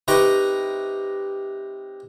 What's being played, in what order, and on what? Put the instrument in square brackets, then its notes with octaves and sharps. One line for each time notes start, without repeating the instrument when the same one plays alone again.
[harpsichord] C3 D#4 B4 A#5 C#6 D6